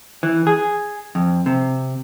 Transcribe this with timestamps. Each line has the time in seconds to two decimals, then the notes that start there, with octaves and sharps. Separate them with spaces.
0.23 E3
0.47 G#4
1.15 F2
1.46 C3